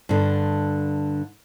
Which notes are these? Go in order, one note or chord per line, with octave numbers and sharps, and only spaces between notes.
G2 D3